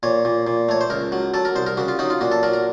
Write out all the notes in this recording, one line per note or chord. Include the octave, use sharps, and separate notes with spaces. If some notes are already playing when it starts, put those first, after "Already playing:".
A#2 C#5
A#2
A#2
A3 C#5
C5
C#2 A#4
F#3
F#3 A4
A#4
C2 C5
A#4
C#3 F#4
F4
F#3 D#4
F4
A#2 F#4
A4
F#3 A#4
A#4